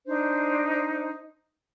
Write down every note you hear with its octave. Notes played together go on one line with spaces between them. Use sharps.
D4 D#4 C5